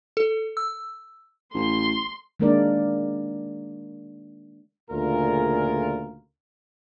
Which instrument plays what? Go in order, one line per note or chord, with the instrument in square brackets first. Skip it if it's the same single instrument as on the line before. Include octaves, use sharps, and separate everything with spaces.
[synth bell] A4
E6
[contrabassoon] A1 [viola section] C6
[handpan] D#3 G#3 A#3 D4 A#4 D5
[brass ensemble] D2 A#2 C#3 F4 G#4 A#4